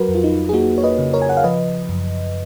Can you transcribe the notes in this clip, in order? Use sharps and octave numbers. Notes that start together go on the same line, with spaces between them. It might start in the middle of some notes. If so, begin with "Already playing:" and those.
Already playing: F#3 F#4 A#4 B4
F2
F4
D#4
G#4
A#3 D#4 F#4
C#5
B4 D#5
C#3
A#4 C#5
G#5
F#5
F5
F3 B4 D#5
F#2